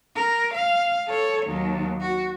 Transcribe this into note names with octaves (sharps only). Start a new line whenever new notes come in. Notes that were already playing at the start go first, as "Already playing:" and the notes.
A#4
F5
A4 C#5
D#2 F#3
F#4